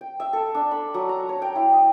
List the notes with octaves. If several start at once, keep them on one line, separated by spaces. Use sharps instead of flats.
G5
E5
A4
D4
B5
F#3
A#5
C#5
G5
E4
D#5